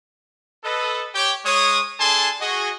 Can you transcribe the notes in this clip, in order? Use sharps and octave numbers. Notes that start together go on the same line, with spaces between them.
A4 B4 D#5
G4 C#5 G5
G#3 C#5 D#6
D4 G#4 A4 G#5 A5 C6
F#4 G#4 D#5